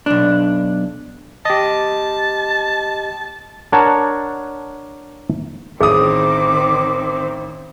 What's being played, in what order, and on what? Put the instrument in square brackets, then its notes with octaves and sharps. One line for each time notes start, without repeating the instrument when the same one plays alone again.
[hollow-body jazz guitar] B1 D4
[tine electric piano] G4 D#5 [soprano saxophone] A5
[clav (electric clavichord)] D4 A#4 C#5 F#5 A5
[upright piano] A1 D#6 [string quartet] D#3 C4 [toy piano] G#4 [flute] D6